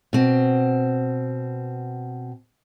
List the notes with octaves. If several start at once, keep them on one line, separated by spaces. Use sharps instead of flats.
B2 C4